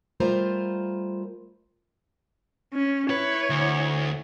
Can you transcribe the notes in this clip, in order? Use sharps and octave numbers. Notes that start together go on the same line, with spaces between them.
G3 A3 F4 A#4 C5 A#5
C#4
E4 B4 C#5
D2